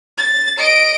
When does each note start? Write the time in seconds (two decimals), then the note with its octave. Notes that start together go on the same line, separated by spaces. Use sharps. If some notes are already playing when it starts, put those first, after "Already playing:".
0.18 A6
0.58 D#5 D7